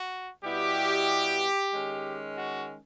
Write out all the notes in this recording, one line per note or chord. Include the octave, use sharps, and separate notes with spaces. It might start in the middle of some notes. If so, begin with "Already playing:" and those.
Already playing: F#4
B2 G3 B3 E4 G4
D#3 G#3 C#4
F#4